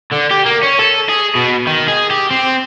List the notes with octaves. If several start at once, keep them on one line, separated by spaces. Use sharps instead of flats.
D3
G4
A#3
C#4
A4
G#4
B2
D#3
G#4
G4
C4